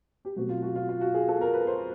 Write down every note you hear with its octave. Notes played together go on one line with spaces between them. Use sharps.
G4
B2 F#3 A3 C4 F#4
F4
F#4
F4
F4
F#4
G#4
A4
A#4
B4
C5